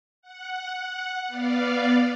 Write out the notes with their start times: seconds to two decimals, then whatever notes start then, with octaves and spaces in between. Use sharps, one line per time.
0.22 F#5
1.28 B3 D5 F5